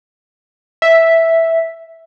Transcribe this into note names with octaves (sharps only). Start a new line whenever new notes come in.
E5